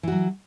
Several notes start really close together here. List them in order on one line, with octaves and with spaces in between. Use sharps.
E3 F#4 F#3